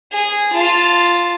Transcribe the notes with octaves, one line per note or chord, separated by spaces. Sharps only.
G#4
F4 A5